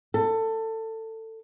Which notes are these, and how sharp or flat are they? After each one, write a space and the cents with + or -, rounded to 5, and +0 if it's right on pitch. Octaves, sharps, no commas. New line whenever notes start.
A4 +20